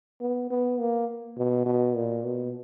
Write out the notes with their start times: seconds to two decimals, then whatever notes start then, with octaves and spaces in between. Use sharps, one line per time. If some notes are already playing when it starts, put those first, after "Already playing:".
0.21 B3
0.51 B3
0.80 A#3
1.38 B2
1.66 B2
1.96 A#2
2.24 B2